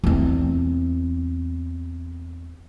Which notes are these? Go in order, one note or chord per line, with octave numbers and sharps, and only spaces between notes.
E2 C4